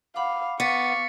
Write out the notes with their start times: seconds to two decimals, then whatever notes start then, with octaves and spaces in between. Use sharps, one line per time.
0.16 F5 F#5 B5 D6
0.60 B3 F5 C#6 D6 A6 B6 C#7